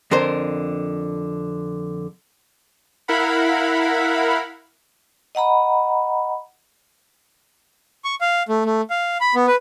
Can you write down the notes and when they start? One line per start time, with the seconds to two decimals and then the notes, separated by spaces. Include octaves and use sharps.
0.11 F2 D3 A#4 C5
3.08 E4 A#4 F5 F#5 B5
5.35 D#5 F#5 A#5 B5
8.05 C#6
8.21 F5
8.49 A3
8.65 A3
8.90 F5
9.21 B5
9.35 B3
9.47 B4